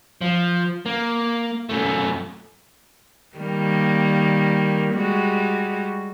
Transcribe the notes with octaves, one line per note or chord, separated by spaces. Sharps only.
F3
A#3
F#2 A3
D#3 G3 A#3
G3 G#3 F#4